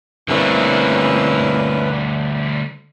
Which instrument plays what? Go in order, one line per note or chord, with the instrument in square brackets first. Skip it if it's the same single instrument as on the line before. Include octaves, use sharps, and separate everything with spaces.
[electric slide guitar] D3 G3 A3 [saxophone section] A#3 C4 E4 [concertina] C#4 B4